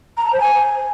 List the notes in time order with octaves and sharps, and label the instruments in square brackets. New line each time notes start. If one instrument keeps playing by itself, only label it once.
[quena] A#5
A5
C5
G#5